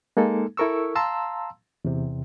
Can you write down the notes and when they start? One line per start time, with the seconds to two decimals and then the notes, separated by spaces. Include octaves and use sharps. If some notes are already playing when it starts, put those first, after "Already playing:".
0.17 G#3 A#3 D#4 A4
0.57 E4 A4 A#4 C#6 E6
0.95 F5 A5 A#5 C6 E6
1.85 E2 C3